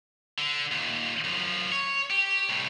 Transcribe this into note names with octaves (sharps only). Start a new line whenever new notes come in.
D3
D#2 A#2
F#2 F3
C#5
G4
C2 A2